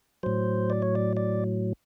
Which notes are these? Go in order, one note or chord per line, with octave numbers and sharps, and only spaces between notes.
A2 F#3 C5
D5
C#5
D5
D5